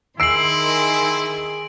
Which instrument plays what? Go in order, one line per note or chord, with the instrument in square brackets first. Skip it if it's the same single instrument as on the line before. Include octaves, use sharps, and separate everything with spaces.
[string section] D#3 G#4 C6 [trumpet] E4 [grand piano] E6 C7 [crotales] D7 F#7